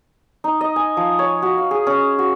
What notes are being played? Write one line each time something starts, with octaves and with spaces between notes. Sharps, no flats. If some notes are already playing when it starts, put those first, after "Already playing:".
D#4
D#5
G#5
F3
C#5
F#4
F5
G#4
C#4
F#4